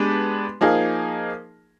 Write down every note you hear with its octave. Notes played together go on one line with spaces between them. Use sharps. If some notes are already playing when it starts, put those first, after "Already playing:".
Already playing: G#3 B3 D4 G4 B4
F3 A#3 D#4 G#4